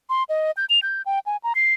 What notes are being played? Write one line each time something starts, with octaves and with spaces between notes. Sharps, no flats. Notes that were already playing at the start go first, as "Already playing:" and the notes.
C6
D#5
G6
F7
G6
G5
G#5
A#5
C7